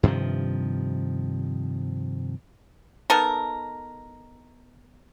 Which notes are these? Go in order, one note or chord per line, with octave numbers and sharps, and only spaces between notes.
G2 C3 D#3 F3
B3 D#4 A4 A#4